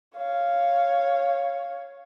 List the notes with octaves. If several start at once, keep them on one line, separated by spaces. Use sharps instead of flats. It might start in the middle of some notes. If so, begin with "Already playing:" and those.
C#5 F5